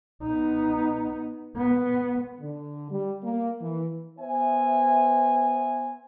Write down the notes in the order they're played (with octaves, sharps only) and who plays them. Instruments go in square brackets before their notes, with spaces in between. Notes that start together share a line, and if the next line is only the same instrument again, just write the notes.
[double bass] B3 D#4
B3
[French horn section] D3
G3
A#3
E3
[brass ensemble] B3 C5 E5 G#5